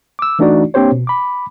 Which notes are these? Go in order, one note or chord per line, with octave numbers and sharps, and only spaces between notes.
D6 E6
E3 A3 D4 D#4 F#4 D5
A#3 C4 D4 G4 C5 C#5
B2
B5 D6